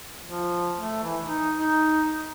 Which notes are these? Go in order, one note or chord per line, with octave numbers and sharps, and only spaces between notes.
F3
A3
E3
D#4
D#4